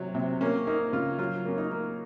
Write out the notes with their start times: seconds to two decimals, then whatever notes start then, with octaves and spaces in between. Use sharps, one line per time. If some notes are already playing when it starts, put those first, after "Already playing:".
Already playing: C3 F#3
0.15 C3
0.41 A#3 C#4
0.67 A#3 D#4
0.93 C#3 F4
1.19 F#3 F4
1.45 A#3 C#4
1.58 D#4
1.71 A#3